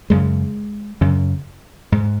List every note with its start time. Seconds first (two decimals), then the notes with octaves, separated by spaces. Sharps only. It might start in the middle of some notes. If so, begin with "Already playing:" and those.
0.10 F#2 C#3 G#3
1.01 F#2 C#3
1.92 G#2